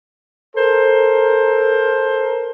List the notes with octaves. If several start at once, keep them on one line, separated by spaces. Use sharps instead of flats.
A4 A#4 C5